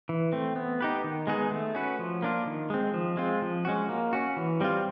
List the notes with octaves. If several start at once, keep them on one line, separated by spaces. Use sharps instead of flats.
E3
A3 C4
B3
D#4 G4 B4
D#3
G#3 B3 D#4 G#4
A3
C#4 F#4 B4
F3
A#3 D4 F4
D#3
G#3 C4
F3
G#3 C4 F4
F3
G#3 C#4 F#4
A#3
C#4 F#4
E3
G3 C4 F4